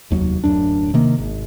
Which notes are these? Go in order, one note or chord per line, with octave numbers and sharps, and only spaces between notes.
F1 D#2 F#3
D1 F#2 D4
C3 D#3 A#3
G#1